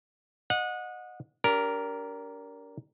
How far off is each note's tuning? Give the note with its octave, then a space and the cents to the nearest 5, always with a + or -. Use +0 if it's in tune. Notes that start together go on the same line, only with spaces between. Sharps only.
D#5 -15 F#5 -25
D4 -40 G4 -10 A#4 +0